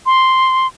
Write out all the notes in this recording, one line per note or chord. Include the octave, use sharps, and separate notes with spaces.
C6